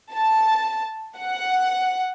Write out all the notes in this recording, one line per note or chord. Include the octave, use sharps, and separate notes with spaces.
A5
F#5